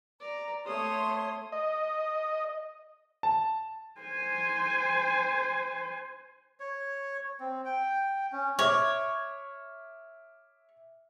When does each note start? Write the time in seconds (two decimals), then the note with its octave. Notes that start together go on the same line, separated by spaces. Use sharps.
0.20 D5 A#5
0.65 A3 C#5 C6 D#6
1.52 D#5
3.23 A5
4.01 C5 G#5
6.60 C#5
7.40 C4
7.65 G5
8.32 C#4
8.59 C#5 E5 D6 F6